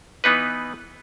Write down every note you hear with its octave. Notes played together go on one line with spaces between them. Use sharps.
E3 B3 D#4 B4